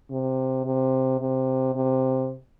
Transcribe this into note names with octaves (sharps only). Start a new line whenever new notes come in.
C3
C3
C3
C3